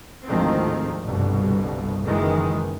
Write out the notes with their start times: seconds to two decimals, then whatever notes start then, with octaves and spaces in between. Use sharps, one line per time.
0.26 D2 G#2 D#3 F3 C4
1.07 G1 C2 G2 B2
2.06 F#1 F#2 D#3 E3 G#3